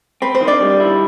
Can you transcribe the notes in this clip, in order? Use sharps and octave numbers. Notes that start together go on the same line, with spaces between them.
C4 B4
C5
D#3
D4 D5
G3
E4